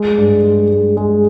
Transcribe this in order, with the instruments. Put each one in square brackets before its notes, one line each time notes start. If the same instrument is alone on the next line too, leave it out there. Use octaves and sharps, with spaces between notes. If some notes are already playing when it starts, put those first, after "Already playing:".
Already playing: [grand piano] G#3
G2
G#3
G#3
G#3